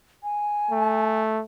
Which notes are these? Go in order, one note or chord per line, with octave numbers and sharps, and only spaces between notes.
G#5
A3